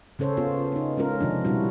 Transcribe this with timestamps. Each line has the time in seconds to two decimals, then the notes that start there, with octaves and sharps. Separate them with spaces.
0.19 C#3 C#4 A4 C5 C#5
0.37 B3 F4 G#4
0.72 B3 D#4
0.97 G#3 C#4 F4 A#4
1.21 C3 D#3 F3 D4
1.45 B2 G3 D4 E4 F#4